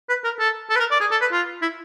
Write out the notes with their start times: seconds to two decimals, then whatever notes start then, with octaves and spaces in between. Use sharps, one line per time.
0.09 B4
0.24 A#4
0.39 A4
0.70 A4
0.76 B4
0.80 A#4
0.91 D5
1.01 G#4
1.11 A4
1.21 B4
1.32 F4
1.62 E4